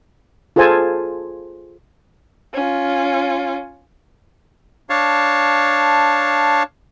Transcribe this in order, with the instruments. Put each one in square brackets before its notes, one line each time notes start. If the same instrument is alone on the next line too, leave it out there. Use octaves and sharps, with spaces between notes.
[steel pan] F4 G#4 A4 C5 G#5 A5
[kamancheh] C#4 F4
[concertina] D4 C#5 F5 A5